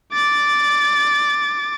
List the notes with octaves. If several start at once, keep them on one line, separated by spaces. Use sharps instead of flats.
D6 A6